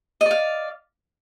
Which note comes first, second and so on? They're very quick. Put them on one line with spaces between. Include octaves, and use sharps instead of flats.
D#5 D5 F5